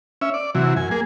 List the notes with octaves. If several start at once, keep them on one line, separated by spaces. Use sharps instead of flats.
C#4 E5
D5
C3 E3 F#3
F#2 G#5
A#3 G#4